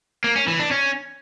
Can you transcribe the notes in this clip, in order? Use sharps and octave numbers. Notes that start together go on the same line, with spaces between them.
A#3
C#4
E3
D4
C#4